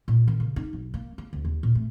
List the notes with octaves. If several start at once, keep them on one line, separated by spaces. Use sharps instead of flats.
A#2
D#3
C#3
D#4
B1
A#3
A#3
D2
D#2
A#2
A3